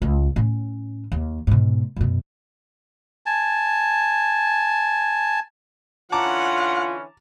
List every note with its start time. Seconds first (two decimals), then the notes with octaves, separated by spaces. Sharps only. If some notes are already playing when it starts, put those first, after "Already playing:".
0.02 C#2
0.36 A2 C#4
1.12 D#2
1.47 G#2 B2
1.96 F#2 B2
3.26 G#5 A5
6.12 D3 E3 C#4 F4 F#5 A5 A#5 D6